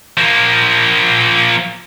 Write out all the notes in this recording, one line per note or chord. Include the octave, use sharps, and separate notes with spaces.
F3 A#3